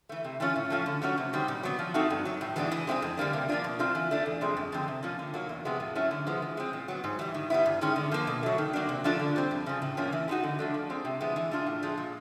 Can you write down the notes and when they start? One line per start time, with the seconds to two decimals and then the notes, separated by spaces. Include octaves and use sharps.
0.09 E3 A3
0.24 C3
0.40 E3 A3 C#4 F4
0.56 A2
0.70 F3 A3 C#4 F4
0.86 D3
1.02 F#3 A3 C#4 F#4
1.18 C3
1.33 D#3 G3 C4
1.48 A#2
1.63 F#3 B3
1.79 F3
1.94 A3 C4 D#4 F#4
2.10 G2
2.25 D#3 F#3
2.41 A2
2.56 E3 G#3 B3 D4
2.72 E3
2.87 G#3 C4 E4 G#4
3.02 F2
3.17 D3 G3 A#3 D4
3.33 C3
3.49 F3 A#3 D4 F4
3.64 B2
3.79 F#3 A3 C4 F4
3.95 E3
4.11 A3 D4
4.26 E2
4.41 C3 F3 G#3 C4
4.57 F#2
4.72 D3 F3 G#3 C4
4.88 C3
5.03 F3 A#3 C#4 F4
5.19 D3
5.34 F#3 A#3 D#4
5.49 E2
5.65 C3 F3 G#3 B3
5.80 A2
5.95 F#3 A3 C#4 E4
6.11 D3
6.27 F3 G#3 B3
6.42 E3
6.57 G#3 C4
6.73 A#2
6.88 F#3 B3
7.04 G#2
7.19 E3 G3
7.34 D#3
7.50 G3 B3 E4
7.66 G2
7.81 D#3 G#3 C#4
7.96 D3
8.12 F3 A#3
8.27 B2
8.43 F#3 A3
8.58 D#3
8.73 F#3 A#3 D4
8.89 C3
9.04 F3 A3 D4 F4
9.19 D3
9.36 G3 C4
9.51 F2
9.66 C#3 F3
9.82 A2
9.97 F3 A#3 C#4
10.12 E3
10.28 G#3 B3 D#4 F#4
10.43 D3
10.59 F3 A3 D4
10.74 F3
10.90 G#3 C4
11.05 C3
11.21 F3 G#3 B3 E4
11.36 E3
11.51 A3 D4 F4 G#4
11.67 A2
11.83 F3 G#3
11.98 A#2